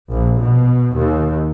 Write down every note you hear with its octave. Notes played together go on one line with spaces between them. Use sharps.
A#1
B2
D#2